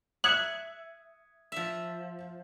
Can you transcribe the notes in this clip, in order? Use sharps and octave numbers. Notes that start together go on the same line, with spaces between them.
E5 D#6 F#6 G#6 C#7
F3 E5